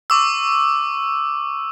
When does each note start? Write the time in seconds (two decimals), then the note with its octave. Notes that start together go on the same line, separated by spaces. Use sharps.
0.10 C#6 D6 E6